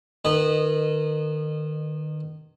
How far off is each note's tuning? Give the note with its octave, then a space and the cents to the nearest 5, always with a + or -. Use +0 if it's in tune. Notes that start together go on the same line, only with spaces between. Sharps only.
D#3 -30 B4 -10 D#5 -20